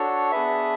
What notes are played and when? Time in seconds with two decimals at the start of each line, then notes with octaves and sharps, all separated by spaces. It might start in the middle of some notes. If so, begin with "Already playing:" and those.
Already playing: D4 F#4 A4 C#5
0.32 B3 D4 G#4 B4 E5